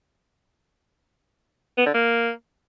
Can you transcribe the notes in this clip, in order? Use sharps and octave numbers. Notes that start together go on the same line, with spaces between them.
B3
D3
A#3